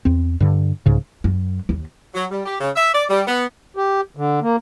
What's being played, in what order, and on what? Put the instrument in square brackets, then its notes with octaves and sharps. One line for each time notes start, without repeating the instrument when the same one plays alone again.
[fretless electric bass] E2 C4
G2 D3
C2 G#2 C#3
[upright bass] F#2
D#2
[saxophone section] F#3
G3
G4
C#3
E5
D5
G3
B3
[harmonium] G4
D3
A#3